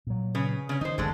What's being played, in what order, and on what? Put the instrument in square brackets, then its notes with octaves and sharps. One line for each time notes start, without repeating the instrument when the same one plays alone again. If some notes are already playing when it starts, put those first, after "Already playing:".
[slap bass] A#2 F#3
[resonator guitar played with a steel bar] C#3 B4
C#3 C#4
[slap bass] D#3 [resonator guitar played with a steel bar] D#4 C5
[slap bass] E1 [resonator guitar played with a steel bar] D3 G#3 A3